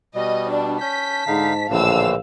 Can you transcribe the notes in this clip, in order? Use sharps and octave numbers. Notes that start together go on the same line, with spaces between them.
B2 G3 D#5
D4 A5
C#4 G6 B6
G#2 D3 D#4 F5
A#1 A2 D3 E3 F5 E6